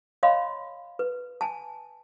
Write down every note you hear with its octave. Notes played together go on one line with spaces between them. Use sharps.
C#5 D#5 F5 B5 C6
B4
G#5 A5